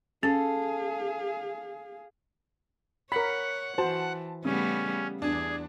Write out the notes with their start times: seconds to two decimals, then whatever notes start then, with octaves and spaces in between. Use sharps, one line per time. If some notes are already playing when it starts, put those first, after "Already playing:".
0.23 C#4 G#4 A4 F5
3.12 A#4 C#5 F#5 B5 B6
3.78 E3 F#4 C5 A5
4.45 C#3 G3 A3 B3 C#4
5.22 E2 D4 G#4